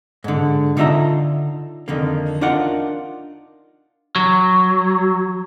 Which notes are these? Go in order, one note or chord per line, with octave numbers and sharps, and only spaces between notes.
G#2 D3
D3 D#4 F4 G4 E5 A#5
F2 D3 D#3 A#3
D4 D#4 F4 A#4 F#5
F#3